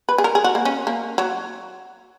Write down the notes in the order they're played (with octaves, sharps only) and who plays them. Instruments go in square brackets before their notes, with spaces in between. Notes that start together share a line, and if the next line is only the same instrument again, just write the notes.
[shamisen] B4
G#4
A#4
G#4
F#4
A#3
C#4
A#3
F#3